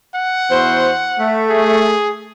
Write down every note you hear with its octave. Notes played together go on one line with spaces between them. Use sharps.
F#5
E2 F#4 C5
A3
G#4